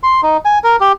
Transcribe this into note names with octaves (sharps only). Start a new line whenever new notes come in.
C6
D#4
G#5
A#4
G4